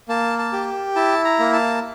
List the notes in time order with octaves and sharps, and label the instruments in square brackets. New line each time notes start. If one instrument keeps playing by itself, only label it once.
[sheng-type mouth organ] A#3 A5
A5
G4
E4 A5
A#5
A#3
A5